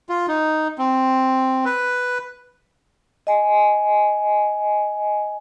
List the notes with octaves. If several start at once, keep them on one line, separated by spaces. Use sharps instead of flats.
F4
D#4
C4
B4
D#5 G#5